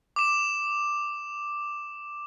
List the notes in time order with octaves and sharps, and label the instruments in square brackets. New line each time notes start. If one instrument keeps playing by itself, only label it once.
[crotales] D6 E7